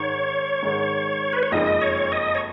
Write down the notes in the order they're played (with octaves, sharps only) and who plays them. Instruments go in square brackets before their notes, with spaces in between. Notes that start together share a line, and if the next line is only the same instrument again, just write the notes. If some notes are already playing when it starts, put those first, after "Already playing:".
Already playing: [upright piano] G#2 D#3 G#3 [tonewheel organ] C#5
[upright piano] G#2 D#3 G#3
[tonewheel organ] B4
C#5
[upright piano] F#1 F2 F3 G#3 D#4 [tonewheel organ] D#5
[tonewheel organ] C#5
D#5
C#5